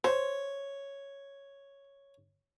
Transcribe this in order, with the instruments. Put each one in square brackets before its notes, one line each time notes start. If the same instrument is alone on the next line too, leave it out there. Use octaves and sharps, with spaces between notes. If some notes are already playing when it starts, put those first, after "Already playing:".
[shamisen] C5 [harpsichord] C#5